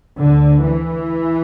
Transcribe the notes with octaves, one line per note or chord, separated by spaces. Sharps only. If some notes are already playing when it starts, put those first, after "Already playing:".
D2 D3
E3